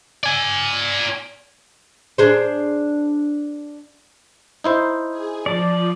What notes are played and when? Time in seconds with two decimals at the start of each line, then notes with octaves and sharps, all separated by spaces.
0.23 D5 G#5
2.18 D4 G#4 C5
4.64 D#4 E4 C5
5.10 G#4
5.46 F3 D5 A5